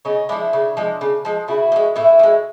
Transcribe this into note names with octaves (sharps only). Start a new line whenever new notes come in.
C#3 C#4 D#4
F3 G#3 D4 E4
C#3
F3 G#3
C#3
F3 G#3
C#3 E4 F#4
F3
G#3
A2 E4 F#4
F3
G#3